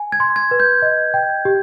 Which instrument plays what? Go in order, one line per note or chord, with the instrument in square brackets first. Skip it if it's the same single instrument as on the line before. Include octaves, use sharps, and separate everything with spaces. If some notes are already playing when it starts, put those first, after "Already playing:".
Already playing: [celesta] G#5
[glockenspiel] G#6
[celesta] C6
[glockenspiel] G#6
[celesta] B4
[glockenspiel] G6
[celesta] D#5
G5
G4